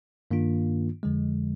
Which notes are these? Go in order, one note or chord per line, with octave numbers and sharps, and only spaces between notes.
G2 D#3 A#3 D4 F4
F2 D3 F3 G#3